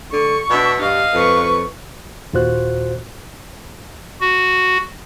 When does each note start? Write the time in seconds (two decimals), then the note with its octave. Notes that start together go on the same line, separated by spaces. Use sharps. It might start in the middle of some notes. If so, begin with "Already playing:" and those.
0.13 D3 C#6
0.50 B2 D4 E5
0.81 G2 D#5 F5
1.14 F2 B4 C#6
2.33 D#2 A#2 F4 F#4 C5 F#6
4.21 F#4